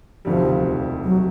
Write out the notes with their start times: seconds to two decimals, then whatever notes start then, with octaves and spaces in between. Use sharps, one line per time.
0.25 E1 D2 C3 D#3 F3 G3
1.04 F#3